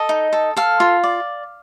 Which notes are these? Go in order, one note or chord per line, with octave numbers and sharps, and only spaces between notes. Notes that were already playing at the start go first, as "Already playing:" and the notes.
Already playing: A4 D#5
D#4
A4
A4 F5
F4
D5